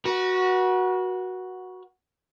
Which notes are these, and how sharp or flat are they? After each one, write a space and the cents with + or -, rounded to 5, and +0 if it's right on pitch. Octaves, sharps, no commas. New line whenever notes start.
F#4 +0 B4 -40